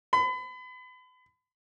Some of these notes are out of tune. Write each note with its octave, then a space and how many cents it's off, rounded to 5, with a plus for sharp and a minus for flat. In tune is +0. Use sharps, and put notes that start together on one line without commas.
B5 +35